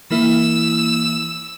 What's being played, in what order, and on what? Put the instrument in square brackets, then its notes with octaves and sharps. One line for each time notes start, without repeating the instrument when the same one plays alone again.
[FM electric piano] E3 A#3 E4 [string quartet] E6